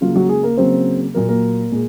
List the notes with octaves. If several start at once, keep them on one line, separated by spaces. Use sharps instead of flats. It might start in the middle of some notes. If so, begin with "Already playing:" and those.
C#3 F#3 A#3 F4
F#3 F#4
G#3 G#4
A#3 A#4
C#3 F#3 A#3 C4 C5
A#2 F#3 A#3 A#4
A#3 A#4
A#2 G#3